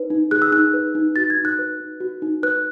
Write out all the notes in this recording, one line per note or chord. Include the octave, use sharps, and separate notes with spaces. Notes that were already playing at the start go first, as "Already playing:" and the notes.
Already playing: D#4 B4
D#4
G#4 F#6
E6
D#4 F#6
B4
D#4
F#4 A6
G#6
D#4
F#6
B4
D#4
F#4
D#4
B4 F#6